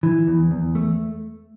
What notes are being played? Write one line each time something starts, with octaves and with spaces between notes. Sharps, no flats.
E3
E2
E2
A3